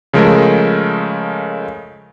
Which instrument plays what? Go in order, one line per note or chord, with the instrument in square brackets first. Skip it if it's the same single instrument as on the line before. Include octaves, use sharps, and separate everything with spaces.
[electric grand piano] C#3 F3 G#3 A3 A#4